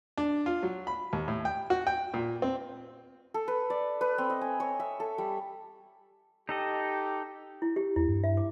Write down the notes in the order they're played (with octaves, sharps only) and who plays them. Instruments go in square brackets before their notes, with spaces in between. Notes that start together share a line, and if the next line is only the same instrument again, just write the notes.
[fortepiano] D4
F4
F#3
B5
D#2
A2
G5
F#4
G5
A#2
C4
[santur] A4
B4
D5
B4
C4
D#5
G#5
C#5
E5
A4
G3
[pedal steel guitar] D#4 A4 D#5 [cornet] G4
[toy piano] E4
G4
[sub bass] E2 [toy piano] E4
[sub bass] G2
[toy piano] E5
D6